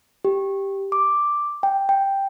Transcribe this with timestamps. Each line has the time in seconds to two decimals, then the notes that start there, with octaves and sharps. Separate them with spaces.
0.25 G4
0.92 D6
1.63 G5
1.89 G5